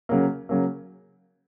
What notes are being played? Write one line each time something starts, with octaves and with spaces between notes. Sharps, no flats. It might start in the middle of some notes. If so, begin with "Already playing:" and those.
C#3 F#3 A#3
C#3 F#3 A#3